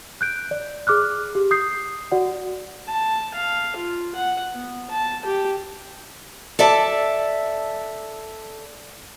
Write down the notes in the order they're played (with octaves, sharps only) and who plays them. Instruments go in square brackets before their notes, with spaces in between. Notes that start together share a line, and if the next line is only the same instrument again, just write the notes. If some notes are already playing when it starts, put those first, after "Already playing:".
[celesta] F#6 G6 D7
D5
G#4 D6 F6 F#6
G4
D#6 G6 C7
F#4 D5 F#5
[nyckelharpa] A5
F5
F4
F#5
B3
A5
G4
[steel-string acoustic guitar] A4 D5 E5 A5